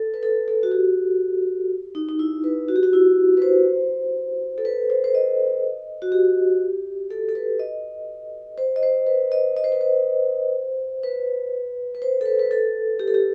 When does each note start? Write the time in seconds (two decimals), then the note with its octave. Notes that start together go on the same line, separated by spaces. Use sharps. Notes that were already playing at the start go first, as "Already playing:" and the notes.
Already playing: A4
0.14 B4
0.23 A4
0.48 A4
0.63 F#4
0.72 G4
1.95 D#4
2.09 D#4
2.19 E4
2.44 B4
2.69 F#4
2.76 G4
2.83 F#4
2.93 E4
3.37 B4
3.42 C5
4.58 A4
4.65 B4
4.90 C5
5.04 C5
5.15 D#5
6.02 F#4
6.12 G4
7.10 A4
7.29 A4
7.35 B4
7.60 D#5
8.58 C5
8.76 D#5
8.83 C5
9.07 B4
9.32 D#5
9.57 D#5
9.64 C5
9.72 B4
9.81 C5
11.03 B4
11.95 B4
12.02 C5
12.21 A4
12.26 B4
12.39 B4
12.51 A4
12.99 G4
13.08 A4
13.14 G4